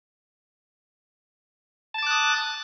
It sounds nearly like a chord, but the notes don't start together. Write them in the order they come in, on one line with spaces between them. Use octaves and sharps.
A5 A6 D6 F#6 D#6